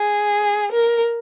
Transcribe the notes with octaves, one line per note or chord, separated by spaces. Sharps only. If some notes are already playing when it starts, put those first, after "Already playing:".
Already playing: G#4
A#4